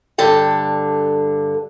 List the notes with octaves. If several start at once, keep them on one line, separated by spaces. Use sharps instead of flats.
G2 D3 A4 G5